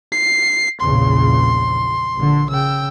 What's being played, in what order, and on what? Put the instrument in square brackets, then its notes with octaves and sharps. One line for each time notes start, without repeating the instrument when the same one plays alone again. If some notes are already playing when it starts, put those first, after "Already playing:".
[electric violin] C7
[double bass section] A#1 E2 C#3 [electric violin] C6
[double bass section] A#1 D3
[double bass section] C#3 [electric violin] G5 E6